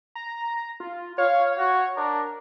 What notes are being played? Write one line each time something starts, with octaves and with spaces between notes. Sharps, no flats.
A#5
F4
C#5 F5
F#4
D4 A#4